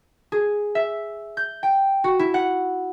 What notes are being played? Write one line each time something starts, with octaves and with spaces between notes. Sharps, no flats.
G#4
E5
G6
G5
F#4
E4
F#5